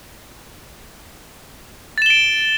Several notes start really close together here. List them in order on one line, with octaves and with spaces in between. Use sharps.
A6 E7 G7 D7